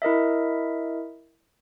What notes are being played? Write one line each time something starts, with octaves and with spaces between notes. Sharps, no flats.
E4 A#4 D#5 E5